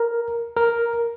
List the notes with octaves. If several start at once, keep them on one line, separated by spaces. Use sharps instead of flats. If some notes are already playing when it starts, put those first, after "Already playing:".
Already playing: A#4
A#4